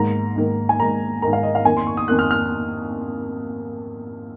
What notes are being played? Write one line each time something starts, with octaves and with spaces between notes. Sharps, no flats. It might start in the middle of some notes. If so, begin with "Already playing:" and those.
Already playing: G#2 D#3 A#3 A#5
G#2 D#3 A#3
G#5
G#2 D#3 A#3 A#5
G#2 D#3 A#3 A#5
F5
D#5
F5
F2 D#3 A#3 G#5
C6
C#6
D#6
F2 D#3 A#3 F#6
F6
F6